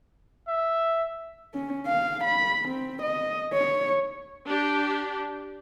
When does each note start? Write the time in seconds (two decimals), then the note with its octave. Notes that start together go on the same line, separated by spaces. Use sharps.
0.48 E5
1.54 C#4
1.87 F5
2.24 B5
2.69 C4
3.02 D#5
3.53 C#5
4.46 D4 G4